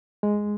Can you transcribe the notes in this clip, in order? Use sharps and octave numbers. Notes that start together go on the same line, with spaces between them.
G#3